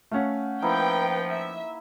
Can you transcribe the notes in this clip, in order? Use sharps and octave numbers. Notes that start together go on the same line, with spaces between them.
A3 C#4 F5 F#5
F3 A#3 D#4 E4 B4 G5
E5